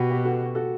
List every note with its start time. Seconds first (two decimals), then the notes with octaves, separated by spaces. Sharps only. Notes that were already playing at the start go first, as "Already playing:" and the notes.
Already playing: B2 F#4 G4 B4
0.11 G4 B4
0.25 F#4 A4
0.55 F#4 A4